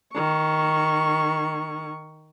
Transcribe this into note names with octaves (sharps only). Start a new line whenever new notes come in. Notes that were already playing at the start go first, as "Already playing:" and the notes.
D#3 C#6